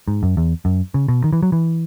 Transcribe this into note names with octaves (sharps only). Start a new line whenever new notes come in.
G#2
F#2
E2
F#2
C#3
B2
D#3
E3
F#3
E3